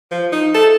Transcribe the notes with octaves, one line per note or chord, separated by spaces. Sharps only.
F3
D#4
A4